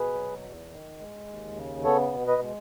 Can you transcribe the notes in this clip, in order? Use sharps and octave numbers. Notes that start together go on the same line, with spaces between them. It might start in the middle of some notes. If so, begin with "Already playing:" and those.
Already playing: B2 G#4 B4
F#3
E2
D#3
G#3
D#2
C#3
B3 A4 C#5
B2
B4 D#5
G#3